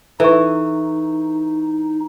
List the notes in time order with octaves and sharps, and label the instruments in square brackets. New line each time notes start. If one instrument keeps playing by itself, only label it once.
[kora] E3 [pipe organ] D#4 [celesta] A4 E5 C#6